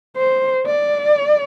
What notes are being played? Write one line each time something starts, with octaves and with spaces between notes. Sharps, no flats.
C5
D5